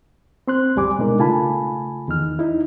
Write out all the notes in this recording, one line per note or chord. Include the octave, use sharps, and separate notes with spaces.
C4 C6 F#6
C#2 F#2 G3 G#5 D6
B2 G#3 D4 D#4 A#4
C#3 A3 F4 G#5 A5 B5
E2 D#3 D#4 F6
D#4 E4